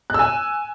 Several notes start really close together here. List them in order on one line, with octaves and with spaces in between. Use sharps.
F#6 E6 G#5